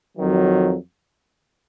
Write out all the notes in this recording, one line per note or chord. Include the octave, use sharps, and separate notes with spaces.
F2 D#3 F#3